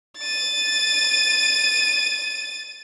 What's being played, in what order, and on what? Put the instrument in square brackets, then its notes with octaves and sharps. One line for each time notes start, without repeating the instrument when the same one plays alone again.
[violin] A6 D#7